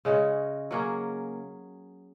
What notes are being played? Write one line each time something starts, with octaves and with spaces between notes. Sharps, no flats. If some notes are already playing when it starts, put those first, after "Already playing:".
C#3 G#3 C#4 F#4
F#3 A#3 C#4 G#4